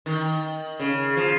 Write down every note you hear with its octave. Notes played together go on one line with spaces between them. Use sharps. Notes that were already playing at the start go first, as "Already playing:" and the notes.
D#3
C#3
F3